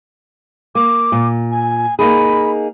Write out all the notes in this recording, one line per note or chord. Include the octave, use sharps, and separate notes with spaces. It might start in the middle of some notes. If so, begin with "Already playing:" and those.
A#3 D6
A#2
G#5
A#3 D#4 G#4 B5